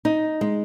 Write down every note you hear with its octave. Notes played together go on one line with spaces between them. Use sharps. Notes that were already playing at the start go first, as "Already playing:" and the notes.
D#4
G#3